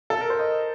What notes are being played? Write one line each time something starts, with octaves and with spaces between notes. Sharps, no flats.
A4
A#4
C5
D#5